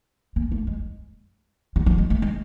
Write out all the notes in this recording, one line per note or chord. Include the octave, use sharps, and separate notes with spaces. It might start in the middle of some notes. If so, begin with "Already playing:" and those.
A#3
A3
G#3
G3
F#3
G#3
A3
G#3